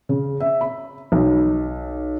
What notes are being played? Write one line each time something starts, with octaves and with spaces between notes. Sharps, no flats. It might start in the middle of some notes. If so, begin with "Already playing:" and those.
C#3
E5
B5
B1